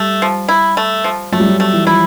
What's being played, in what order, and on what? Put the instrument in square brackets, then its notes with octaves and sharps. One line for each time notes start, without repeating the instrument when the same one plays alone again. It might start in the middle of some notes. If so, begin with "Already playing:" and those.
Already playing: [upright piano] G3 [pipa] A3
[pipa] F3
E4
A3
F3
[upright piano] F#3 [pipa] A3
[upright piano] G3
F#3
[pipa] A3
[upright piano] E3
[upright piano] F3 [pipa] E4